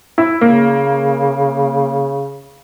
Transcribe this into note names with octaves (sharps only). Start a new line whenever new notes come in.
E4
C#3 A#3